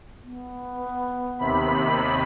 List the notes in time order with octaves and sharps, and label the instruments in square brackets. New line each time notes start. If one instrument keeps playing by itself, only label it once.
[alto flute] B3
[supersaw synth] D#2 C3 B5